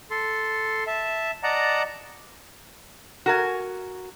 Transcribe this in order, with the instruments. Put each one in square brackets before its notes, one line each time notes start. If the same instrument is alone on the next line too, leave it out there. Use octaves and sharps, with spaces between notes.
[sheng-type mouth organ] A4 C6
E5 A5
D5 D#5 F#5 A5 A#5
[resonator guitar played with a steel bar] F#4 A#4 G#5